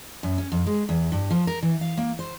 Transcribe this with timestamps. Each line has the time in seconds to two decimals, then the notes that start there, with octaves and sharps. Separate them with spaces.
0.23 F#2
0.38 C#4
0.52 F2
0.66 G#3
0.89 E2
1.12 G2
1.31 F3
1.47 A#4
1.63 E3
1.81 F5
1.97 A#3
2.19 C5